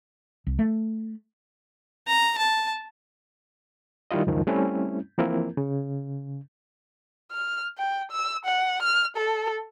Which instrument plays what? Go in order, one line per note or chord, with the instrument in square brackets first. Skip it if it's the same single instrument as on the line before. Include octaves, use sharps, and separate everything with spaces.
[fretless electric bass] C2
A3
[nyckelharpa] A#5
A5
[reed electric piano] D#3 G3 E4 F4 D#5
C#2 F#2 D#3 F3
G3 A3 C4 C#4 E4
E3 F3 A#3 C4 E4 A#4
C#3
[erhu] F6
G5
E6
F#5
F6
A4